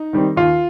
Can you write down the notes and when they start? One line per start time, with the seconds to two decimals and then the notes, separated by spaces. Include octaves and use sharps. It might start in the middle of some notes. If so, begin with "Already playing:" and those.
Already playing: D#4
0.13 D#3 G3 C4
0.36 D#2 F4